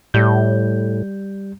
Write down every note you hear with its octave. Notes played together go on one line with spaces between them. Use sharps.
A2 G3 G6